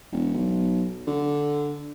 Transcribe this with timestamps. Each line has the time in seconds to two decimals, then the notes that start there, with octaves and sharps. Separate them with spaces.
0.12 E1
0.34 B1
1.07 D3